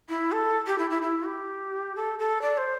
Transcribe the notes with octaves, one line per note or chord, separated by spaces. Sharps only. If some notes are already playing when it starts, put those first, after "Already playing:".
E4
A4
G4
E4
E4
E4
G4
A4
A4
D5
C5